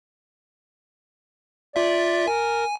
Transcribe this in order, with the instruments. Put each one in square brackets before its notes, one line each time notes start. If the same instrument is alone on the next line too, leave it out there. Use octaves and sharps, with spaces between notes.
[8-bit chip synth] F4 E5 [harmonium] D5
[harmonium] A#4 [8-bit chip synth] G#5